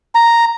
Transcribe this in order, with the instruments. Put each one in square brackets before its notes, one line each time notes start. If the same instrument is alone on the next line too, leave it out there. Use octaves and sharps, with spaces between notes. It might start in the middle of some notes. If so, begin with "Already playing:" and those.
[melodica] A#5